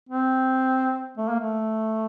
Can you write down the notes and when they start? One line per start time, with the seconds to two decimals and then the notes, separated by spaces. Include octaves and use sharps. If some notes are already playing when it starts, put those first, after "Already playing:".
0.10 C4
1.18 A3
1.29 A#3
1.40 A3